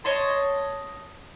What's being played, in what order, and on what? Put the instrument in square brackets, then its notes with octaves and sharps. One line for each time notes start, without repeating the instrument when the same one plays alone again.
[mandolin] C#5 D#5 A5 C6